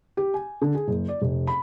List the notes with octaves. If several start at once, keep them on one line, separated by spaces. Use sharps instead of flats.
G4
G#5
D3
G#4
F#1
D5
F1
B5